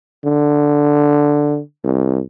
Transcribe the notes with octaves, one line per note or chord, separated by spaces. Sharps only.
D3
C2